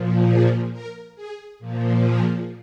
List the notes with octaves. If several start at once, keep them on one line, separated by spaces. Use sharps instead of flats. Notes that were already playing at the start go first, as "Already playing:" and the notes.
Already playing: A#2 F3
G#4
A#4
G#4
A#2 F3
G#4